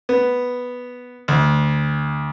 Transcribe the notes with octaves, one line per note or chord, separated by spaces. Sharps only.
B3
D2